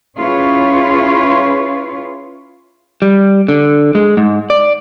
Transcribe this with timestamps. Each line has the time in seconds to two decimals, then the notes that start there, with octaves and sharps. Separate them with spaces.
0.17 C#4 E4 F4 G#4 B4 C#5
3.02 G3
3.48 D3
3.95 G#3
4.17 G#2
4.50 D5